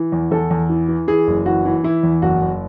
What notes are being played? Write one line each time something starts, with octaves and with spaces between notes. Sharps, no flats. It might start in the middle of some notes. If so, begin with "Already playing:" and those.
Already playing: E3
E2
E2 A4
E2
E3
E3
E3 G#4
F#1
E3 F#4
E3
E3 E4
E2
F#1 F#4
F#1